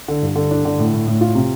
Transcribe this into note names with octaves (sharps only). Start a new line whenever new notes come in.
D3
G2
D3
D4
D3
A2
A2
A2
F4
C3